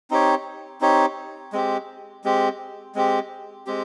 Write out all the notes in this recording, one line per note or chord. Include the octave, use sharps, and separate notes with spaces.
C4 D#4 G4 C#5
C4 D#4 G4 C#5
G#3 C4 G4
G#3 C4 G4
G#3 C4 G4
G#3 C4 G4